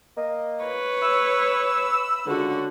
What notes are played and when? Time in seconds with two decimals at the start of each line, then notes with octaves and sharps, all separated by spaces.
0.17 A#3 D#5
0.64 B4 C#5
1.03 B5 E6
2.27 C#2 D3 F#4